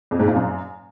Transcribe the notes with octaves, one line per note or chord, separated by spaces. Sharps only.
F2
G#2
A#2
F#2